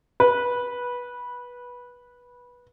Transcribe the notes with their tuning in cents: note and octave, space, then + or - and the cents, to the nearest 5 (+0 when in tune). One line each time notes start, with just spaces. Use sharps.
B4 -15